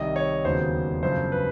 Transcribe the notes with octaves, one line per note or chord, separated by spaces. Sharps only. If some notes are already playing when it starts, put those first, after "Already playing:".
Already playing: C2 C3 D#3 D#5
C#5
E1 D#2 C#3 F#3 B3 C5
G1 F#2 C#3 F3 C5
B4